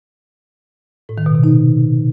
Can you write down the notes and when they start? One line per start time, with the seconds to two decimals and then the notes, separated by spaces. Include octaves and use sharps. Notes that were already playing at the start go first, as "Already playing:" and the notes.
1.09 A2
1.18 D#3
1.26 B2
1.35 C3
1.44 D#4